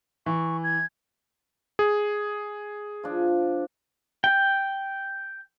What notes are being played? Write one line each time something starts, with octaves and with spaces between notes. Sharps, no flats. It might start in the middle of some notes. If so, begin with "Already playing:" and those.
E3 C#6
G#6
G#4
F3 D4
G5